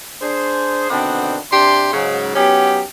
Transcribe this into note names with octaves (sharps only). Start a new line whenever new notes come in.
D4 G#4 C5
B2 D3 D#3 B3 C4 D4
C3 D4 G4 C6
G#2 C#3 F#3
F#3 B3 C#4 D#4 G4